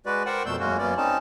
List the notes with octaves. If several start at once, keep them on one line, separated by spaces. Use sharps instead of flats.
G#3 F#4 B4 D5
A#4 C5 D5 F#5 G5
F2 B2 A3 E6 G6
F#2 G#3 A#3 C#4 F#4
F#2 A#3 B3 C#4 D5
C4 C#4 D#4 A5